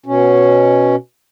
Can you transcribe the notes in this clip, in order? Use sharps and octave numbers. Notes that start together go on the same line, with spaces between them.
B2 C#4